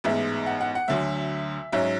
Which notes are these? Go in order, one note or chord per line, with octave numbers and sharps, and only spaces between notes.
A1 G#2 G#3 B3 E5
F#5
F#5
F#5
D2 D3 F#3 E5
G#2 F#3 C#4 E5